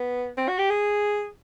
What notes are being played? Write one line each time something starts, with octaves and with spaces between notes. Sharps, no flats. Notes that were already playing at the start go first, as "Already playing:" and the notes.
Already playing: B3
C4
F#4
G4
G#4